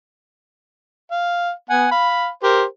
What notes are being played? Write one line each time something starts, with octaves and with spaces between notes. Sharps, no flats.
F5
B3 F#5 G#5
F5 B5
G4 A#4 C5